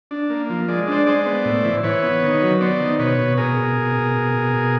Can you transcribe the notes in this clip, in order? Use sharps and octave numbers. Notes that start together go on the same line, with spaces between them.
D4
A#3
F3
G#3 D5
D4 C5 D5
G#3 C5 D5
B3
A2
E3
E3 B4 C#5
B3
D#3
F#3
B3 C5 D5
D#3
B2 B4 C#5
B2
B2 G#4 A#4
B2
B2
B2
B2
B2
B2